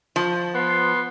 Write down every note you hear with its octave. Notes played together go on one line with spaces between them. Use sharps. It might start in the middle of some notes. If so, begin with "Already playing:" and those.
F3
B3 C6